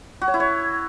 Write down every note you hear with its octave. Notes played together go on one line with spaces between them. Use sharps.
F#4
C#5
E4
C#5